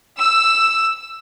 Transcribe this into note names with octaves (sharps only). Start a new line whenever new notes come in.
E6